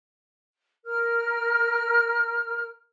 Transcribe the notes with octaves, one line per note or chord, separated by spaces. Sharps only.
A#4 F6